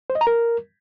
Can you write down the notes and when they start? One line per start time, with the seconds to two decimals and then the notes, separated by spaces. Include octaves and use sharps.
0.10 C5
0.15 D#5
0.21 A#5
0.27 A#4